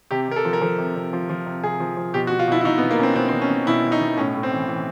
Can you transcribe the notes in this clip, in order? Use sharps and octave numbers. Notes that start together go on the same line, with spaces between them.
C3 G4
C3 A#4
A4
F3
A#4
F3 A4
C3
C3
F3
F3
C3
C3 G#4
F3
F3
B2 G4
F#4
B2
F4
B2 E4
E4
B2 D#4
B3
B2
A#3
B2 C4 C#4
B2 C4
C4
B2
C#4
B2
B2 E4
B2
D#4
B2
A2 C#4
A2
C4
E3
E3